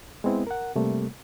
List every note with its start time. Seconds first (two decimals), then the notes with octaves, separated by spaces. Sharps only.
0.24 G#3 B3 C4 E4
0.47 A#4 F#5
0.76 C3 G3 A3 A#3